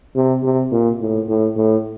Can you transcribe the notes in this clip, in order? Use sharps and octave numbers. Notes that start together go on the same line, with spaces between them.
C3
C3
A#2
A2
A2
A2